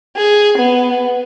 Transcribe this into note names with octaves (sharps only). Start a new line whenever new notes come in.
G#4
B3